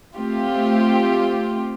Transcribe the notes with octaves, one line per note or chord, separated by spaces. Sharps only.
A3 C4 F4 G4